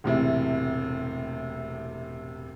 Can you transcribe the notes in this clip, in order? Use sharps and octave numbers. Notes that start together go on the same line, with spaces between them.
E1 A2 C3 E4